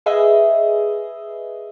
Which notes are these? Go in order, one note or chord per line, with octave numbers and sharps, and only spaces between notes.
G#4 B4 D#5 E5